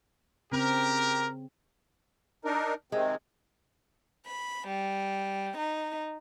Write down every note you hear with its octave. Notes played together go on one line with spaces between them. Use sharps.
C#3 C4 G4 A#4
D4 D#4 A#4
C3 D#3 G#3 C4
B5
G3
D#4